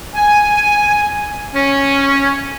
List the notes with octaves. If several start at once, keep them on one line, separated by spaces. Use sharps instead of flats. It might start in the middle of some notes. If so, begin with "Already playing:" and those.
G#5
C#4